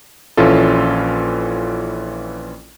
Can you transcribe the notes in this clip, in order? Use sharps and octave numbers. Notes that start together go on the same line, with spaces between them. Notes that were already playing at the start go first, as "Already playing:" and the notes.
A#1 E3 C#4 F4 A4